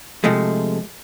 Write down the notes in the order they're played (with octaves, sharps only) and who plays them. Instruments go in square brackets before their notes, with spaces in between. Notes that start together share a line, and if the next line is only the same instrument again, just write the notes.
[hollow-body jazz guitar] C3 F3 G#3 A3